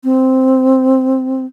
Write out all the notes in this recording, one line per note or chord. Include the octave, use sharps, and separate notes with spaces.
C4